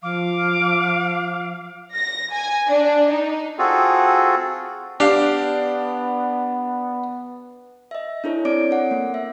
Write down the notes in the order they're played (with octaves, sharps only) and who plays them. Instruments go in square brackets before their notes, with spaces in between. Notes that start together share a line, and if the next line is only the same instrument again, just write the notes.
[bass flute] F3 [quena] F5 [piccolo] D6
[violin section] A#6
G#5
D4
D#4
[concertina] C4 F4 F#4 G#4 A4
[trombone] B3 [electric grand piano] D4 [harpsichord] G4 F5
[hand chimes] D#5 E5
D4 E4 A4 C#5
C4 C#5 D5 D6 D7
A4 F#5
A#3
E5